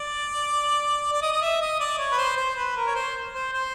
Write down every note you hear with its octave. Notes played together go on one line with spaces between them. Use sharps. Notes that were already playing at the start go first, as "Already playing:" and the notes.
Already playing: D5
D5
D#5
D#5
E5
D#5
D5
C#5
B4
C5
C5
B4
A#4
C#5
C5
C5
C5